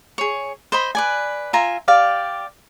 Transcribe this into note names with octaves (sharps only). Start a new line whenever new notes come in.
G#4 C#5
C5 D#5 B5
B4 D5 G#5
F4 E5 G#5 A#5
G4 D5 F5